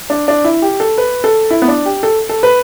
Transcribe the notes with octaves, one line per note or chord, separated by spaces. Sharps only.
D4
D4
E4
G4
A4
B4
A4
E4
B3
D4
G4
A4
A4
B4